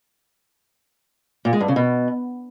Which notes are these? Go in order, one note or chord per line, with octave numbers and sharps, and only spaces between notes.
A#2
G#3
G2
C#3
B2